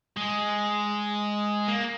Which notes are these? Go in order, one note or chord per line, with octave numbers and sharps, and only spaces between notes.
G#3
A#3